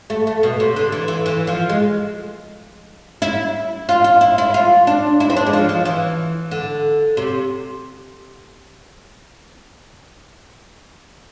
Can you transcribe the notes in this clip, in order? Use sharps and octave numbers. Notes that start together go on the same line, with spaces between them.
A3
A3
B2
C3
D3
E3
E3
E3
F3
G#3
E4
F4
F4
E4
E4
F4
D4
E4
C4
D4
G#3
F3
F3
E3
D3
C3